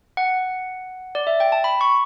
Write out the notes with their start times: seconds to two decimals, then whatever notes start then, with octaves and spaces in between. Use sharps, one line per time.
0.17 F#5
1.15 D5
1.27 E5
1.40 G5
1.52 A5
1.64 B5
1.81 C#6